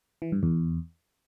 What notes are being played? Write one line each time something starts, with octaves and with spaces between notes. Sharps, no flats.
E3
G2
E2